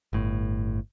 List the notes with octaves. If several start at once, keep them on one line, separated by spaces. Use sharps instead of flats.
G1 A2